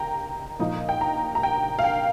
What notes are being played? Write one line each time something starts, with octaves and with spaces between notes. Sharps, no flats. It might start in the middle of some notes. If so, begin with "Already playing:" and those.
Already playing: G5 A#5
A#2 F3 D#4
G5
A#5
A#5
G5
F5
G5